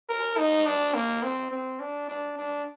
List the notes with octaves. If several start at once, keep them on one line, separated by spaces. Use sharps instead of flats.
A#4
D#4
D4
A#3
C4
C4
D4
D4
D4